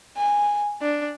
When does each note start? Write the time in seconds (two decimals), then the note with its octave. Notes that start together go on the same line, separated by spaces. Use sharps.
0.17 G#5
0.82 D4